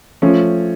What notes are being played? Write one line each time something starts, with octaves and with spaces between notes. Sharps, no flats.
F3 A3 C#4